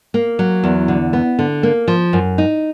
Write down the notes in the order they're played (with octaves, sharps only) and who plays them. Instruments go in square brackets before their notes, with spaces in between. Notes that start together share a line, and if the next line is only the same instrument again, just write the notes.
[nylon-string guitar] A#3
F#3
E2
D3
B3
D3
A#3
F3
F#2
D#4